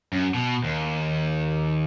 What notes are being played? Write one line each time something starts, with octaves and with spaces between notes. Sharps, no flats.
F#2
B2
D#2